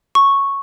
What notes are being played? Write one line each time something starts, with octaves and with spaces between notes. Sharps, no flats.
C#6